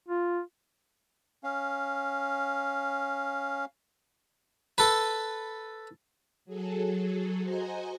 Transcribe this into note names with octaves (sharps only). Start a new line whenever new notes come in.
F4
C#4 F5
A4 B4
F#3 G#4 A4
F#4 C5 D#5 G#5 A#5